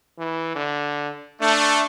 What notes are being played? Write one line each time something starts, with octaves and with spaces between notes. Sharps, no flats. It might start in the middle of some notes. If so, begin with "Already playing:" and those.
E3
D3
A3 D4